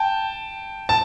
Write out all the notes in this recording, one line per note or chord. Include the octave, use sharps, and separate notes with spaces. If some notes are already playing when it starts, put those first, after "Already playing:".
Already playing: G5 A5
A5